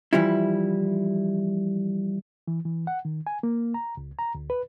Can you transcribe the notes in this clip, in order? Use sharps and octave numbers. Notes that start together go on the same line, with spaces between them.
E3 F3 G3 E4
E3
E3
F#5
D#3
G#5
A#3
A#5
C#2
A#5
D2
B4